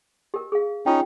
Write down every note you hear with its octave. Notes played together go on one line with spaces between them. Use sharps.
G4 A#4
G#4 F5
C#4 D#4 F4 G5